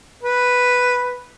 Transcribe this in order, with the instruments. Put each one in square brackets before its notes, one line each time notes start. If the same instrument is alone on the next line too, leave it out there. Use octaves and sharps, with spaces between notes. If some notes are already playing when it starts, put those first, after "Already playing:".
[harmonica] B4